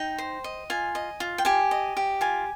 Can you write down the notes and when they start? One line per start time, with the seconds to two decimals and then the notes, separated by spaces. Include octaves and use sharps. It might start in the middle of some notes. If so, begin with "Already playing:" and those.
Already playing: D#4 G5
0.18 C5
0.44 D#5
0.70 F4 G#5
0.95 D#5
1.20 F4
1.38 G5
1.45 G4 G#5
1.71 D#5
1.97 G4
2.21 F4 G#5